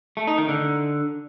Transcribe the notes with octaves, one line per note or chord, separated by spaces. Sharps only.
A3
D#4
D#3
D3